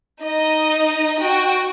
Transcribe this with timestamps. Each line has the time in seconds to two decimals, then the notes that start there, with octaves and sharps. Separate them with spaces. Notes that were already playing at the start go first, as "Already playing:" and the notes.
0.23 D#4 D#5
1.19 F#4 G5